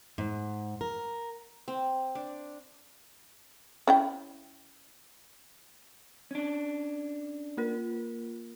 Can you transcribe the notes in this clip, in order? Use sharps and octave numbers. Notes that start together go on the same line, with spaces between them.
G#2
A#4
C4
D4
C#4 E4 G5
C#4 D4
A#3 F4 A#4